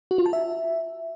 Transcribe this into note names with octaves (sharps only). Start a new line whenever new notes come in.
F#4
F4
A5
E5